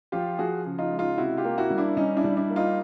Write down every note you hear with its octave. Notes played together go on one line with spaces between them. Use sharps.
F3 F4 G4
F3 F#4 G#4
C#3
D#4 F4
G#3
D#4 F4
C3 E4 F#4
F4 G4
A#3
E4 F#4
G3
D4 E4
G3 C#4 D#4
D4 E4
G3
D4 E4
A#3
D#4 F4